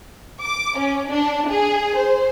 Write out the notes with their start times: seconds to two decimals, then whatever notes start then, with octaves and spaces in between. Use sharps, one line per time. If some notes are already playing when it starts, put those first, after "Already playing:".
0.41 D6
0.79 C#4
1.10 D4
1.49 G#4
1.96 C5